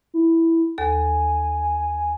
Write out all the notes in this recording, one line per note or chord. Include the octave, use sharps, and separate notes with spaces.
E4
D#2 A4 G#5